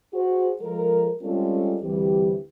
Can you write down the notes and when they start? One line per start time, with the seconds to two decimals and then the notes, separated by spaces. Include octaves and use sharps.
0.14 F#4 G#4 C5
0.61 F3 G#3 A4 A#4
1.22 G3 G#3 C4 C#4 F4 A4
1.82 D2 E3 G3 C4 G4